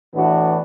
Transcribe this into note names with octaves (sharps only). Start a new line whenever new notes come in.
A2 E3 B3 D4 F#4